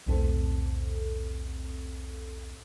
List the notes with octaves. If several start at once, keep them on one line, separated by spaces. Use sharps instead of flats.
B1 E2 A2 C4 A4